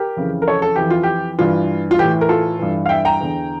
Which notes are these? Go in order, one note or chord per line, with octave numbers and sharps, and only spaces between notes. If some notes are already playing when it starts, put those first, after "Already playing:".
Already playing: G4 A#4
F2 C#3 E3
A#4
A4 C#5
A4
F2 E3 G4
F4
G4
G2 E3 F4
F4
A2 E3 G4
A#4
F4 A4
G2 E3
F5
E5 G5
G5 A#5
E2 D3